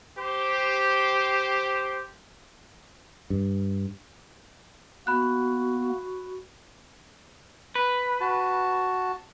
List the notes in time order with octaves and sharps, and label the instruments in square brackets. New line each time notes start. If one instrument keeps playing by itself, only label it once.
[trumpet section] G4 C5
[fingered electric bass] G2
[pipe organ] A#3 B3 [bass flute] F#4 [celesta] B5 F#6
[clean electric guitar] B4
[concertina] F#4 A5